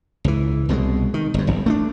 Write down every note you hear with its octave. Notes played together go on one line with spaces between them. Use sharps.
C#2 E3
C2 B2 F3 G#3
D#3
G1 F#2
G1
A3 C4 D4